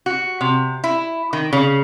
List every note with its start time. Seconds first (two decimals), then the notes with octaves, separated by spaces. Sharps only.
0.06 F#4
0.41 C3
0.84 E4
1.33 D#3
1.53 C#3